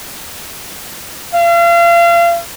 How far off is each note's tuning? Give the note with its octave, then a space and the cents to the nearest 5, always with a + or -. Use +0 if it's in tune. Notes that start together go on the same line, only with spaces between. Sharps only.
F5 -35